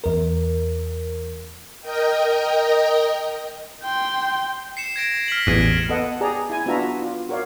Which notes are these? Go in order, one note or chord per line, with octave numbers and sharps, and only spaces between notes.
E2 A#4
A#4 D#5 G5
G5 C6
C7 C#7 E7
G#6 A#6 D7
F6 B6 F#7
A1 E2 F#6 D#7
B3 A4 D#5 F#5
G4 G#4 D5 A#5
E4 G#5
B3 D4 F4 F#4 E5 A#5
F4
F#4 A#4 C#5 D5 F5